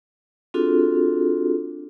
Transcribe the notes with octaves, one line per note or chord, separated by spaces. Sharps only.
C4 D4 F4 F#4 G#4 A4